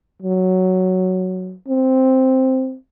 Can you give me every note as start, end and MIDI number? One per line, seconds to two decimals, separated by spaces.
0.22 1.55 54
1.68 2.76 60